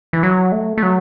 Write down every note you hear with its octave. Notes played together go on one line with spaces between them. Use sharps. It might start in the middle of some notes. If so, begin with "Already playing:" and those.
E3
F#3
A3
A3
F#3